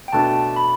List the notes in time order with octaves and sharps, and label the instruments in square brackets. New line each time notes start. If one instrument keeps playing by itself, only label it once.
[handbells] G5
[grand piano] B2 A3 D4 [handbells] A5
[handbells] B5